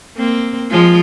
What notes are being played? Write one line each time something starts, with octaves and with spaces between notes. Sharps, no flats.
A#3 C4
F3 G#3 F4